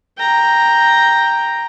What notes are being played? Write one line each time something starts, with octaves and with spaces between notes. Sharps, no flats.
G5 A#5